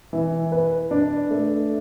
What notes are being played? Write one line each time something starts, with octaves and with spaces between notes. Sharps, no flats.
E3
B4
D4
A3